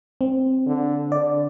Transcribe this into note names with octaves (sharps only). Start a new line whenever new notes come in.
C4
D3
D3 D5